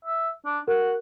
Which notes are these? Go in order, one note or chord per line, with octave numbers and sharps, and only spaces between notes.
E5
D4
F#4 A#4